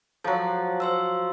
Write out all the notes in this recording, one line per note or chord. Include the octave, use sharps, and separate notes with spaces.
F3 F#3 A4 F#6
C5 C6 E6